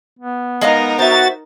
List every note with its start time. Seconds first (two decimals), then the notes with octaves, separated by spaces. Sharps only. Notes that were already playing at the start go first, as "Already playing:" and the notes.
0.19 B3
0.61 G#3 D#4 A#4 D#5 F5
0.99 F#4 C5 E5 A6